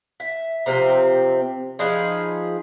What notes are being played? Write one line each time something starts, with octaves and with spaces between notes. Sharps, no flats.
E5
C3 F3 C4 A#5
F3 D#4 G#4 B4